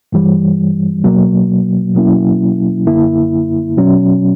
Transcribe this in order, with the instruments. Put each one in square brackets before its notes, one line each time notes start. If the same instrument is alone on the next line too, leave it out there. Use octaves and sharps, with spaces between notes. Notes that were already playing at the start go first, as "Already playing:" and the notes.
[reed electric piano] G2 E3 G3
B2 F#3 A#3
B2 F#3 A#3 C#4 E4
F#2 D3 A#3 E4
B2 F#3 C#4